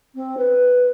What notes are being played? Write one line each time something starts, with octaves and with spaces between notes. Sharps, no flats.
C4
B4